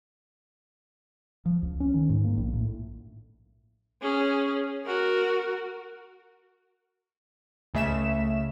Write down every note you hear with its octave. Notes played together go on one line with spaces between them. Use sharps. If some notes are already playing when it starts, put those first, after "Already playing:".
F3
C#2
C#4
D#3
G#2
A#3
A#1
A2
C#4 G#4
F#4 A#4
C#2 C#3 A3 E5 B6 E7